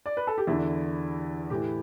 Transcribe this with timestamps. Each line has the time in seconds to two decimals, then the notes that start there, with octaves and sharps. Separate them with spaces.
0.06 D5
0.17 B4
0.27 A4
0.38 G4
0.47 E2 D3 E4
1.50 A2 E3 G4